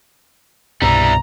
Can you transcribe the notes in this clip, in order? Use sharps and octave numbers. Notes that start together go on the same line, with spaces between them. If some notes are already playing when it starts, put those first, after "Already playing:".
C2 G2 B2 G3 E4 A#5